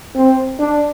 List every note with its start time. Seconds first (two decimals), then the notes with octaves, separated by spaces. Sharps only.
0.16 C4
0.59 D4